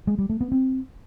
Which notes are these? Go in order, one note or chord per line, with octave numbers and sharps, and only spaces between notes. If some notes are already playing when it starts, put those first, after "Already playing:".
G#3
G3
A3
B3
C4